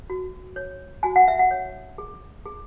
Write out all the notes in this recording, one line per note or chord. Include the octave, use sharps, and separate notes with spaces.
F#4
C#5
F#4 G#5
F#5
E5
F#5
C#5
G#4
G#4